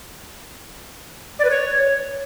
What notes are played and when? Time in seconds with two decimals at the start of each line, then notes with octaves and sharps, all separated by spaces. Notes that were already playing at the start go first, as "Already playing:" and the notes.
1.39 D5
1.45 B4
1.50 C#5